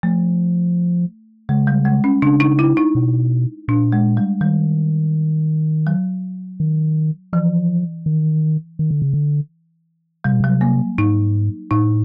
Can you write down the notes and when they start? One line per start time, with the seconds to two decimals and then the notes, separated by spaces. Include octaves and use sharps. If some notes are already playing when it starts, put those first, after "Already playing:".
0.03 F3 A3
1.49 C#3 G#3
1.67 G3
1.85 G#3
2.04 C#4
2.22 C#3 D4
2.40 D#4
2.59 E4
2.77 D#4
2.95 B2
3.68 A#2 D4
3.92 G#3
4.17 G3
4.41 D#3 G3
5.87 F#3
6.60 D#3
7.33 E3 F3
8.06 D#3
8.79 D#3
8.91 D3
9.02 C#3
9.14 D3
10.24 C3 G3
10.33 B2
10.40 C3 F#3
10.61 A#3
10.98 G#2 D#4
11.71 A2 D#4